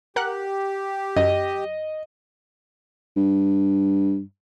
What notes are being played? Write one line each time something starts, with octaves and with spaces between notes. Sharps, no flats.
G4 A#4 F#5 F#6
F#2 D#5
G2